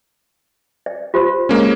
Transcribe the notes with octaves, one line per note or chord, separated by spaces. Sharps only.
D5
F4 G4 C5
G#3 A#3 C#4